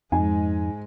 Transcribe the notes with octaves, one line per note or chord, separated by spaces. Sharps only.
F2 G#2 G#3 D#4 G#5